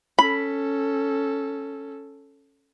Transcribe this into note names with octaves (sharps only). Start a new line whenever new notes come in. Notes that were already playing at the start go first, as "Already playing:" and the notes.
C#4 A4 B5